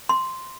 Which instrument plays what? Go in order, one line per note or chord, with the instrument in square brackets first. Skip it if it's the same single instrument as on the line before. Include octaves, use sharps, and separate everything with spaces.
[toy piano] C6